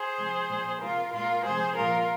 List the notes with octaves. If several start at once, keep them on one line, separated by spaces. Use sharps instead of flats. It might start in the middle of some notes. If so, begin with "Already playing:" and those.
Already playing: G#4 C5
C3 F3 G#3
A#2 F3 G#3
C3 G#3 F4 A#4
A#2 G#3 F4 A#4
C3 F3 G#3 G#4 C5
A#2 F3 G#3 F4 A#4